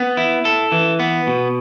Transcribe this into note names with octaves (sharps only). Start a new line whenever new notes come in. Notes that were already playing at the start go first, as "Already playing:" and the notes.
Already playing: B3
E4
A4
E3
B3
B2